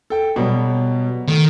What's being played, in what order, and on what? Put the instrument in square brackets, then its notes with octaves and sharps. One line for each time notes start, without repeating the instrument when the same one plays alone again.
[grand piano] A4 G5
B2 F#3 G3
[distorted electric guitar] D#3 [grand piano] A3